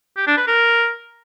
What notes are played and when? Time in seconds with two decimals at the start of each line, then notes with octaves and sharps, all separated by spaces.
0.17 G4
0.27 D4
0.37 B4
0.47 A#4